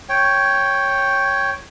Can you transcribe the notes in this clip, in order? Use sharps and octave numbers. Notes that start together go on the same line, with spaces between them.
C#5 G5